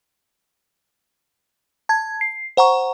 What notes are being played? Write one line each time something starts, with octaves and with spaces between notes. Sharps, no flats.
A5 G#6
C7
C5 F#5 A#5 C#6